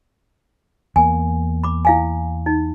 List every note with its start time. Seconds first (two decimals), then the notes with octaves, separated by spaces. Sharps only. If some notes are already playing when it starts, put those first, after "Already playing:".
0.96 E2 A#3 G#5
1.64 B5 D6
1.85 E4 F5 G#5
2.46 D#4